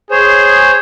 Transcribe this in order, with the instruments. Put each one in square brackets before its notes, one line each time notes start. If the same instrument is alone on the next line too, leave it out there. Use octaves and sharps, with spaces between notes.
[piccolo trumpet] G#4 [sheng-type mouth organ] C5 C#5